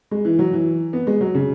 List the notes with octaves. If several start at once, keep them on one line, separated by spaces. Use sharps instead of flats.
G#3
E3
F#3
E3
B3
G#3
F#3
C#3